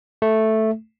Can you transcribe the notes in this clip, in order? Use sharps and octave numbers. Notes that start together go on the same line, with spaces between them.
A3